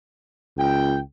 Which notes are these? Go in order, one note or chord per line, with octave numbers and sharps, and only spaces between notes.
C#2 G5